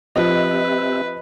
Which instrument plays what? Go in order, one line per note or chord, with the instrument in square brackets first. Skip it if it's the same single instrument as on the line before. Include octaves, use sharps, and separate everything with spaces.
[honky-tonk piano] F3 D#5 [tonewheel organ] C4 G4 E5 [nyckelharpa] B4